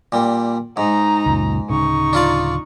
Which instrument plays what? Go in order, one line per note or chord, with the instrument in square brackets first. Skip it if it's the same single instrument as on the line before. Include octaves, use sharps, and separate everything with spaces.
[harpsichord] A#2 G3
[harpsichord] G#2 [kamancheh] D#4 A#5
[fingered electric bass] C#2 F#2 A#2
[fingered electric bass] D1 C#3 [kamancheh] D#4 C#6
[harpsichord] D4 F4 D5